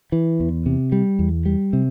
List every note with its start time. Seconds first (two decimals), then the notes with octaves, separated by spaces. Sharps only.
0.12 E3
0.40 E2
0.66 C3
0.92 G3
1.19 E2
1.46 G3
1.73 C3